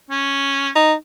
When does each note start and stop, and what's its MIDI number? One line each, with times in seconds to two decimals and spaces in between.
0.10 0.69 61
0.76 0.93 63